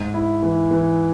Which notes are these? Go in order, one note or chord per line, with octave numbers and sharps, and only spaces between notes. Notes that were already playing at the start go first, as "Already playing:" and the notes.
Already playing: G#2
E4
E3
E3